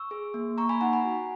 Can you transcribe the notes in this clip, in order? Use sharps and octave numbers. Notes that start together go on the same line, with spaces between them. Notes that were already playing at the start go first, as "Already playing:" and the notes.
Already playing: C#6 E6
G#4
A#3
A#3 A#5 C#6
G#5 B5
D#4 F#5 A#5
G#5 B5
F#4